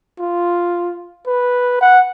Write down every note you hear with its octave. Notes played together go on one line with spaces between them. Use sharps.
F4
B4
F#5